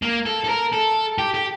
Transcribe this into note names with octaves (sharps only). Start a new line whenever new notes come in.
A#3
A4
A4
A#4
A4
G4
G4